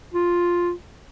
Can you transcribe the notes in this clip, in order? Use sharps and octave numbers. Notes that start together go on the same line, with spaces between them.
F4